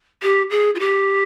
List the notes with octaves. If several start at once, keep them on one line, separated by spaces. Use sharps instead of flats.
G4
G#4
F4
G4